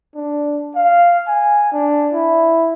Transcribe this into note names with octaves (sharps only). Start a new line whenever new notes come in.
D4
F5
G#5
D4
E4